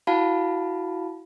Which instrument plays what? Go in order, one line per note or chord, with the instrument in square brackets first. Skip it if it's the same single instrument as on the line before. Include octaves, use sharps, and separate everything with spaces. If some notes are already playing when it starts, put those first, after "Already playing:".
[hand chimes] E4 F#4 F5 A5 B5